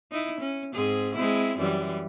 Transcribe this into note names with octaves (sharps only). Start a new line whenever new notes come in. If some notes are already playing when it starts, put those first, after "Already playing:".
D#4 E4
C#4
G#2 C4 G#4
G#3 C4 E4
F#2 E3 G3